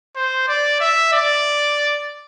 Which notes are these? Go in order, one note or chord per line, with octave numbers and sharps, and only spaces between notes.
C5
D5
E5
D5